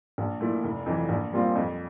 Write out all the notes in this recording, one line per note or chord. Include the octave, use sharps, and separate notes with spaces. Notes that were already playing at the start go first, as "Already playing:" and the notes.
A#1
A#2 A3 E4
F1
F2 E3
A#1
A#2 G3 C4 F4
F2